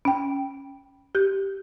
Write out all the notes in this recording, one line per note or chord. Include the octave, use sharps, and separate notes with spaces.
C#4 G5
G4 G6